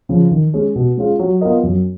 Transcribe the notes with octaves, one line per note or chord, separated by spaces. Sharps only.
C#3 F3
D#3
G#3 C#4 G#4
B2
G#3 C#4 F4 G#4
F#3
B3 F4 A#4 D#5
F#2